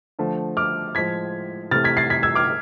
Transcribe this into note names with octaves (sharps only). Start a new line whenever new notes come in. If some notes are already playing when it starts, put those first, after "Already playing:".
D3 F3 A3
D6 F6
A2 F3 G#3 G#6 B6
C3 E3 A3 F6 A6
G#6 B6
A6 C7
G#6 B6
E6 G#6
D6 F6